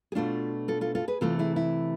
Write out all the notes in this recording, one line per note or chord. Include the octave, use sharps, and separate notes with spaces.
G#4
B2 A3 D4 F4
F4 A4
F4 A4
F4 A4
G#4 B4
C3 E3 A3 F4 A4
E4 G#4
E4